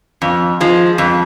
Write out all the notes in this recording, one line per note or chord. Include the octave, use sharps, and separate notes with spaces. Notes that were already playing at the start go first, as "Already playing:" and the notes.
F2
F3 G#3
F2